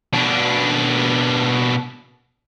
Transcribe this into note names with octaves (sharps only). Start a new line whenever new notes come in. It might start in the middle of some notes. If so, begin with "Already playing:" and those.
B2 D4